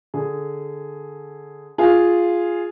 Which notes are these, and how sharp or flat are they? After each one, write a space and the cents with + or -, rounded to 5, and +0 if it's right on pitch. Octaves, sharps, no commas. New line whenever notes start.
D3 +0 G#4 +0
F4 +0 G#4 +0 F5 +0